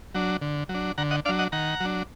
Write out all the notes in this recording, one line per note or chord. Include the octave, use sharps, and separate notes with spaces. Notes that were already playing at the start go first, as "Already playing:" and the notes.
F#3 D4
D3
F#3
D4
D3 F#5 A#5
D#5 F#5
F#3 D4 D5 F5
D#5 F#5
D#3 F#5 A#5
F#3 D4